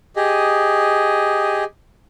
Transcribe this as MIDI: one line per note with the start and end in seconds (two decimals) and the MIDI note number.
0.16 1.64 67
0.16 1.64 68
0.16 1.64 75